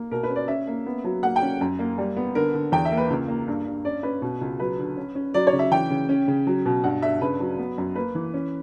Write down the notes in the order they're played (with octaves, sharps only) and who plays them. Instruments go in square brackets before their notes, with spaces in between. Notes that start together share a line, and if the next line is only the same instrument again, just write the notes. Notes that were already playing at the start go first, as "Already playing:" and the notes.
Already playing: [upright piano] A#3
B2 A#4
B4
C#4
D5
C#4 E5
A#3
B3
F#3
A#3 F#5
G5
C#4
F#2
A#3
G3
B3
D3 A#4
D3
E2 G5
E5
A#3
B4
C#2
A#3
G2
G2
C#4 D5
C#4 B4
B2
C#2
F#3 B4
D3
C#4
C#4
F#3 D5
C#5
C#3
E5
E3 G5
C#3
C#4
C#3
F#3
B2
G2 F#5
G2 E5
C#3 B4
F#3
B3
F#2
A#3 B4
E3
C#4